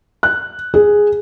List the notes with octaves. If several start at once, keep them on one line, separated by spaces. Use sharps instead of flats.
F#6
G#4